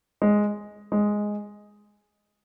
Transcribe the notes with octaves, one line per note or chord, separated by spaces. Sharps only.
G#3
G#3